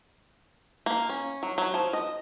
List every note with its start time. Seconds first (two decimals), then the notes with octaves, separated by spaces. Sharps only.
0.86 A#3
1.09 C#4
1.43 F#3
1.58 F#3
1.74 F3
1.93 D#5